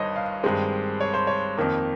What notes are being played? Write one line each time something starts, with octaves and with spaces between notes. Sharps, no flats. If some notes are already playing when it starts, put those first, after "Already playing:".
Already playing: G1 G2 D#3 C5 C#5 D#5
F5
G2 D#3 G#3 C4
C#5
C5
C#5
F2 D#3 A#3